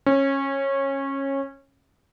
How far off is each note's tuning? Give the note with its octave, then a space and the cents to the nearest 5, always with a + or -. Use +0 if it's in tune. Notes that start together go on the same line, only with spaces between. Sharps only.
C#4 -20